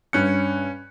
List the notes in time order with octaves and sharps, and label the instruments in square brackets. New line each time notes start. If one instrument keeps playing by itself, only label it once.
[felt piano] G2 F#6 G6 [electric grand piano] C#4 C#7